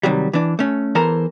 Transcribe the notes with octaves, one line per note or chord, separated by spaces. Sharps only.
C3 D#3 F#3 G3
E3 D4
A3 C#4
E2 E3 A4 A#4 C5 A#5